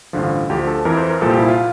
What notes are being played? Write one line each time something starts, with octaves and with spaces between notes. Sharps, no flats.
A1 G2 D3 F3 F4
D2 D3 F3 G4
A4
F2 E3 A#4
C5
A#4
C2 A#2 F3 A4
G4
E4
F4